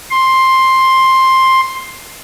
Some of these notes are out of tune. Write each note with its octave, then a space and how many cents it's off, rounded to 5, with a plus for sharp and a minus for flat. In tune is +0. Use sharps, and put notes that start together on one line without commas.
C6 +10